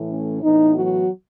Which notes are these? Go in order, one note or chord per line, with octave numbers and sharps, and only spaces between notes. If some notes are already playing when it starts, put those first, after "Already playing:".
Already playing: A2 E3 A3
C#4
A2 E3 B3 D#4
F#3 F#4